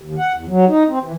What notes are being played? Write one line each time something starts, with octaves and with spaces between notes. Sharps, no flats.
D#2
F#5
E2
F#3
D#4
C4
E3